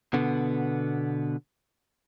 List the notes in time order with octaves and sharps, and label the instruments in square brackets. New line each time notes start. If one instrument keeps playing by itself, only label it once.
[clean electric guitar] B2 D3 B3